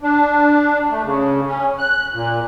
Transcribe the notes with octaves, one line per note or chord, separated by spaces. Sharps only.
D4
A3
C#3
C#4
F#6
A#2